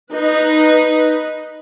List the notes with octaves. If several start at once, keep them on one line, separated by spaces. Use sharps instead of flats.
D#4 B4